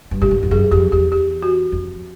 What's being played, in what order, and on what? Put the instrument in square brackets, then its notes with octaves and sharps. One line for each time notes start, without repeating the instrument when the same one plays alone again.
[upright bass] G2
[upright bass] A2 [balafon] G4
[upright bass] G#2
F2
[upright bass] F#2 [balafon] G#4
[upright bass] F2 [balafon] G4
[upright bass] E2 [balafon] G4
[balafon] G4
F#4
[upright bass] F2